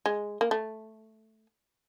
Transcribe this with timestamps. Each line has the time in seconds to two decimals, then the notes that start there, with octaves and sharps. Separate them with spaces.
0.06 G#3
0.41 A#3
0.51 A3